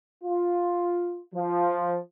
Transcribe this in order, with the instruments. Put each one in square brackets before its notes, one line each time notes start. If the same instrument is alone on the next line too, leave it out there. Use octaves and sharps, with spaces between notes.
[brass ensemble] F4
F3